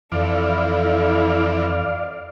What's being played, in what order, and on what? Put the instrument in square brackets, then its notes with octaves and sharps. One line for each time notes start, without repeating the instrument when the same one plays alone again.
[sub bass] F2 [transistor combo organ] E3 F3 [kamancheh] A4 [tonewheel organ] D5 F5
[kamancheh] E4 A4